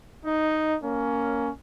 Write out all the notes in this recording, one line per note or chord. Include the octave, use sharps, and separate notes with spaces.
D#4
A#3 C#4